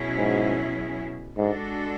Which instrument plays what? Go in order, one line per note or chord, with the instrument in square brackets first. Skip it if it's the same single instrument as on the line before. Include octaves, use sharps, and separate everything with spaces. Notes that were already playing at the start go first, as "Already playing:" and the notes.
Already playing: [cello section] B2 F#3 C#4 E4 G#4
[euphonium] G#2
[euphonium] G#2 [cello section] G#3 D4 F#4 A4